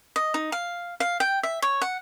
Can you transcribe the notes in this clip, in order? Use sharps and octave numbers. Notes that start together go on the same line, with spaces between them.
D#5
D#4
F5
F5
G5
E5
C#5
F#5